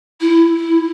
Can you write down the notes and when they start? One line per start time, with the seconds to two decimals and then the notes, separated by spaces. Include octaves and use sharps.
0.21 E4